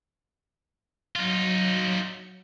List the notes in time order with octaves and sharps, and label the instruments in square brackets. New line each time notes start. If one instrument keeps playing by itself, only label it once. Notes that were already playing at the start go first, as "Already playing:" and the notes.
[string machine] F#3 C#7 [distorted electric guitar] D#4 F4